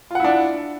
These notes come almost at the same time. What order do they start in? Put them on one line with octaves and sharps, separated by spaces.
F4 F#5 E4 D4